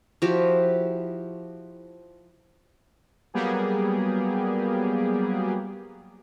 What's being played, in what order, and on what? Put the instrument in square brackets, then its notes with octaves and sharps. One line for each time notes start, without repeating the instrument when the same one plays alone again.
[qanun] F3 E4 F#4 G4
[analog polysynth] F#3 G3 A#3 B3 G4 G#4